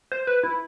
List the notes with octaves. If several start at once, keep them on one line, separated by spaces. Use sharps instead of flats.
C5
B4
E4